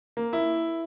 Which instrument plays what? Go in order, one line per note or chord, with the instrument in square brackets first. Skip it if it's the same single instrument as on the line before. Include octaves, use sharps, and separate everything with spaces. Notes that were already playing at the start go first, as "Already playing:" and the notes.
[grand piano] A#3
E4